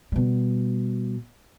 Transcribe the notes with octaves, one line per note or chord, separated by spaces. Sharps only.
B2 G3